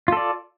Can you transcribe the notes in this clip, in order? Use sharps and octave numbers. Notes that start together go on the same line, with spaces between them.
F4 A4 D5